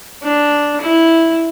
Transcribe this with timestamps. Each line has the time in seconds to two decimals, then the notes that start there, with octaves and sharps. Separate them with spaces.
0.23 D4
0.81 E4